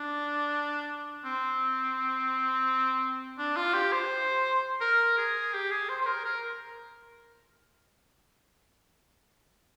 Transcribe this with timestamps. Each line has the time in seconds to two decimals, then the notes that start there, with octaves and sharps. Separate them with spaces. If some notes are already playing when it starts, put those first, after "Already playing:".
Already playing: D4
1.25 C4
3.39 D4
3.57 F4
3.74 G4
3.92 C5
4.81 A#4
5.18 G#4
5.53 G4
5.71 G#4
5.89 C5
6.02 C5
6.06 A#4
6.24 A#4